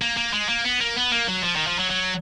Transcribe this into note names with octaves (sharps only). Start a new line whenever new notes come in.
A#3
A#3
G#3
A#3
B3
A#3
B3
A#3
F#3
F3
D#3
F3
F#3
F#3